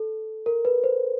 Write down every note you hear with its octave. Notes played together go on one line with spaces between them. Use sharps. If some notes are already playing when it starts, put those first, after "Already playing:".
Already playing: A4
A#4
B4
C5